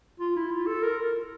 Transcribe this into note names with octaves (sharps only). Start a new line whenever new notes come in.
F4
E4
F4
A4
A#4